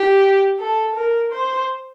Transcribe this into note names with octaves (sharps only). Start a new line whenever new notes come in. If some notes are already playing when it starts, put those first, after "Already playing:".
Already playing: G4
A4
A#4
C5